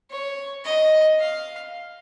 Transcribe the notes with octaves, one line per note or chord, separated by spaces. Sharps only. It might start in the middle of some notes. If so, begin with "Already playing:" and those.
C#5
D#5
F5